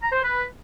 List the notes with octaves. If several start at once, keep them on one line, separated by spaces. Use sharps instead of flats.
A#5
C5
B4